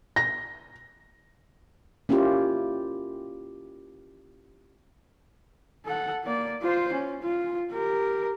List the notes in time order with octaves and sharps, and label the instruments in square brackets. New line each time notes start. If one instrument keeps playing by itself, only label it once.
[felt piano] A#6
[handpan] A#3 C#4 E4 F4 G4
[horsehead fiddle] A4 F#5
A#3 D5
F4 C5
C#4
F4
G4 A#4